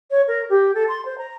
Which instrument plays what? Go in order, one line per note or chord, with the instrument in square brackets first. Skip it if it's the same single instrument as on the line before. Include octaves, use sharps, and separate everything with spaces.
[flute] C#5
A#4
G4
A4
C6
C5
A#5